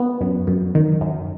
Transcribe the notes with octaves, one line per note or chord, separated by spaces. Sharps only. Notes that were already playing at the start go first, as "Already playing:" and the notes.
Already playing: B3
F#2
F#2
D#3
F#2